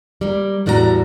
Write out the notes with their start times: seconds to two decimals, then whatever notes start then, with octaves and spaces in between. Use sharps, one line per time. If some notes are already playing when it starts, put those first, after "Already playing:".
0.21 G3 A#3
0.66 E2 A2 G3 F#4 G4 A#5